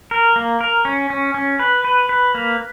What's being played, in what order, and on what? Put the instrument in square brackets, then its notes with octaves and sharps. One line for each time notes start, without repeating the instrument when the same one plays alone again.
[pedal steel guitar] A#4
A#3
A#4
C#4
C#4
C#4
B4
B4
B4
A#3